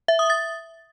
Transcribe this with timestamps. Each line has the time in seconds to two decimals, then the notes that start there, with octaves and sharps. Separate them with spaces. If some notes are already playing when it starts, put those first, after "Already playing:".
0.08 E5
0.19 D#6
0.30 A6